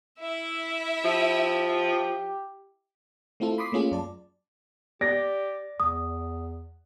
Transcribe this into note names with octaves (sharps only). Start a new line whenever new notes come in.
E4 E5
F3 G4
A3 C4 E4 F4 A4
B5 C6 D6 D#6 B6 C7
A3 A#3 C#4 F4 G#4
F#2 D5 A5
G4 D5 A#6
E2 D#6